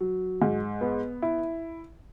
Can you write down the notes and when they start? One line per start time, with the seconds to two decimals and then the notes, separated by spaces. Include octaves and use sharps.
0.01 F#3
0.42 G#2
0.81 B3
1.22 E4